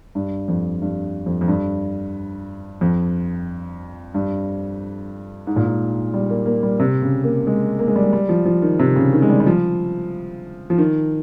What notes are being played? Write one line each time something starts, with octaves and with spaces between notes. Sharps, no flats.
G2
F2
G2
F2
F2
G2
F2
G2
G#2
A#2
G#2
G3
A#3
A#3
G3
C3
C#3
A#3
G#3
A#3
G#3
G3
G#3
G3
F3
F3
D#3
C3
C#3
D#3
G#3
G3
G3
F3
F3
D#3